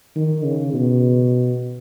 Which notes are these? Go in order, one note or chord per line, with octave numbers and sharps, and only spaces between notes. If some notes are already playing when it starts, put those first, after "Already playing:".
D#3
C#3
B2